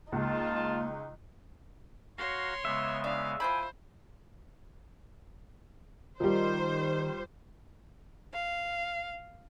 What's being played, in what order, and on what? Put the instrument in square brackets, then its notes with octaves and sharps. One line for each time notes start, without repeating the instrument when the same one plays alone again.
[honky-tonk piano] C#2 [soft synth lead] A#3 [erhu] D#4 [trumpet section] F4 A5
[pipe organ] F#4 F5 A#5 [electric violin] C#5 C6
[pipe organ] C#3 G#3 B3 [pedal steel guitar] E5
[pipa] D4 [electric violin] F5
[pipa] F3 E4 B5 [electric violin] C5 [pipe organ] G5 G#5
[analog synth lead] D#3 [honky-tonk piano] F3 G3 [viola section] C5
[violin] F5